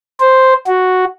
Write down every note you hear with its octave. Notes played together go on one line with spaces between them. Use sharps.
C5
F#4